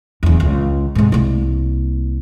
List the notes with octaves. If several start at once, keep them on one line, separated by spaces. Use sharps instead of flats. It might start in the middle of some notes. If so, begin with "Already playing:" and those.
D1 E2
C#2
G#2 C3
C2 A#3